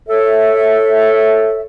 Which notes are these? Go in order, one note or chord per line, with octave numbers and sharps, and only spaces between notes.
A4 C#5 E5